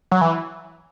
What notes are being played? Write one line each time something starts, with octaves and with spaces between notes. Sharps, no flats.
F#3
E3